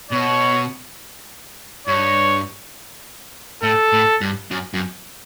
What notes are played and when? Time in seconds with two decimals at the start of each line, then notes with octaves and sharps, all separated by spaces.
0.11 B2 C#5
1.87 G2 C#5
3.63 A2 A4
3.93 A2
4.21 G2
4.51 F#2
4.74 F#2